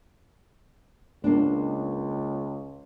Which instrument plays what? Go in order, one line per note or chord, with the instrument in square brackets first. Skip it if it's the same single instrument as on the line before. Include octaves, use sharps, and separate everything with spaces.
[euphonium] C#2 [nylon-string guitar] A#3 D4